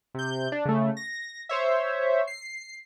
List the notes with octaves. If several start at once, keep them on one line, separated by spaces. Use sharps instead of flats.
C3 G6
D4
C#3 A3
A#6
C5 C#5 E5
C7